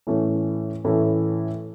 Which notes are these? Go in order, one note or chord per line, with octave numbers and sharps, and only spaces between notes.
A2 E3 A3 C#4 E4
A2 E3 A3 C#4 E4